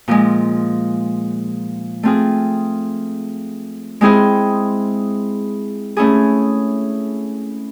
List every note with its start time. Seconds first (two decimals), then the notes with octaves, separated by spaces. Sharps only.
0.08 A#2 F3 G#3
2.03 A3 C4 F4 G#4
4.01 G#3 C4 E4 G#4 C5
5.97 A3 C#4 E4 G#4